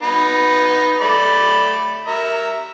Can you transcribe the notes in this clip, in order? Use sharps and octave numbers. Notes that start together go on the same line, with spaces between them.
B3 D#4 B4
A3 D5 B5
A#4 E5